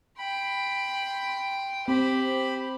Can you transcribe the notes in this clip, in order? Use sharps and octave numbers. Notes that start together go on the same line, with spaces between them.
G5 B5 C6
C4 G4 C5 B5